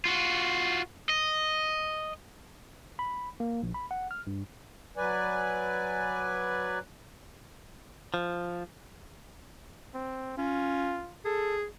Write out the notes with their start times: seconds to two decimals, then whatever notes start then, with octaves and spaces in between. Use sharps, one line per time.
0.05 F4 F#4
1.09 D#5
2.99 B5
3.40 A#3
3.63 A#1
3.74 B5
3.91 F#5
4.11 F6
4.27 G2
4.97 F#3 B4 D5 G#5
8.14 F3
9.94 C4
10.37 C#4 F4
11.25 G#4 A4